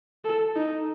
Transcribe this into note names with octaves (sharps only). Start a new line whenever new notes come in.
A4
D#4